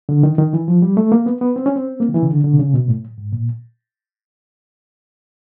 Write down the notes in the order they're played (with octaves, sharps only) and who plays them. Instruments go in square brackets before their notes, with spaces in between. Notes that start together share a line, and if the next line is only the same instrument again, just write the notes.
[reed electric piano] D3
D#3
D#3
E3
F3
G3
A3
A#3
B3
B3
C4
C#4
C4
A#3
D#3
E3
C#3
D3
D3
C3
C#3
B2
A2
G#2
A#2